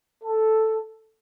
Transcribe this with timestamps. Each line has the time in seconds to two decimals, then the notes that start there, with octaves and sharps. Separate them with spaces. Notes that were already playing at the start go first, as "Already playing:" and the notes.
0.24 A4